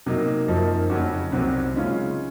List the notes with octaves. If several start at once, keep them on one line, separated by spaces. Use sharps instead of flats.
C3 F#3 A#3 D#4
F#2 F3 A#3 D#4
F2 C#3 F#3 C#4 F#4
C2 C3 F#3 C4 F#4
C#3 G#3 C#4 F4